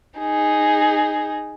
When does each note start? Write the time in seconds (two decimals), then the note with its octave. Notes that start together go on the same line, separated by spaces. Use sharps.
0.19 D#4 G#4